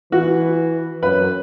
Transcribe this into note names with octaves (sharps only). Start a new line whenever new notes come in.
E3 F#4
F#2 B4